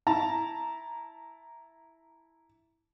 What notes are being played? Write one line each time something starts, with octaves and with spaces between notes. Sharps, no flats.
E4 A5 A#5